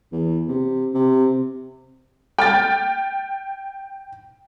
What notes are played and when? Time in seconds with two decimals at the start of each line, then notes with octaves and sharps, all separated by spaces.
0.12 E2
0.49 C3
0.94 C3
2.38 G5 F6 A6